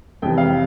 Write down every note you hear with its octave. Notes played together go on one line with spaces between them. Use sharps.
F2 C3 E3 G5
F5